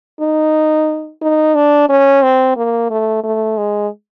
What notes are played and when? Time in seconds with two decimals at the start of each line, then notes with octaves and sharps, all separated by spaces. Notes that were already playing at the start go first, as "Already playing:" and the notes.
0.21 D#4
1.22 D#4
1.55 D4
1.89 C#4
2.23 C4
2.57 A#3
2.91 A3
3.24 A3
3.57 G#3